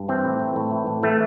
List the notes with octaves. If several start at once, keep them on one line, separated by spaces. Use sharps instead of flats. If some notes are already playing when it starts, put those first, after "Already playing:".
Already playing: G2
E3 C4
A2
E3
A2
E3
A2
E3 A3